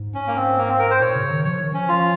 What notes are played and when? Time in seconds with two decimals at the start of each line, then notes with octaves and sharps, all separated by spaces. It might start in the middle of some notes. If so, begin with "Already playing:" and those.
Already playing: G#2
0.14 C#4
0.27 A#3
0.36 C4
0.57 A#3
0.69 C4
0.79 A#4
0.91 C5
1.01 A#2 C#5
1.15 C#3
1.30 D#3
1.45 F3 C#5
1.59 D#3
1.72 F3 C#4
1.88 F4